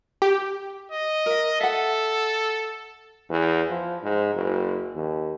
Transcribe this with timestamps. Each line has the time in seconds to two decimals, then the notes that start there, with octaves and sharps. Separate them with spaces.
0.22 G4
0.92 D#5
1.26 A#4 E5
1.61 A4 E5 F#5
3.30 E2
3.70 F3
4.03 G#2
4.34 F#1
4.95 D#2